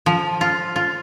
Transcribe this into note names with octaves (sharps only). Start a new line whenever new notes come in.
F3
F4
F4